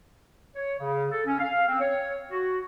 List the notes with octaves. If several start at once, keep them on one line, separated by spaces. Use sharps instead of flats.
C#5
C#3
A4
C#4
F5
C4
C#5
F#4